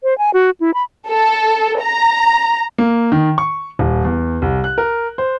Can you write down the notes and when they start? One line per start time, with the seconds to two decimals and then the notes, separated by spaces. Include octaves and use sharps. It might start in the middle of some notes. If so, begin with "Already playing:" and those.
0.03 C5
0.18 G#5
0.34 F#4
0.60 E4
0.74 B5
1.09 A4
1.82 A#5
2.78 A#3
3.12 D#3
3.38 C#6
3.79 D#1
4.05 E2
4.42 C2
4.64 F#6
4.78 A#4
5.18 C5